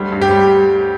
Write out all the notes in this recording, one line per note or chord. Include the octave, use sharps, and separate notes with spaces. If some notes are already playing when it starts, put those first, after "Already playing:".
Already playing: D2 G3
G2
G4
G3